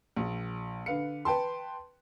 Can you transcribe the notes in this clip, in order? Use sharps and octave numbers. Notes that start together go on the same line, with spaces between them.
A#1
D3 B4 F5 C#7
B4 G5 A5 C6